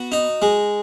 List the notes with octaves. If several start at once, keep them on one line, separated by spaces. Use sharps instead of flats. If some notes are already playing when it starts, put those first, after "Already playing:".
Already playing: B3 F#4
D#4
G#3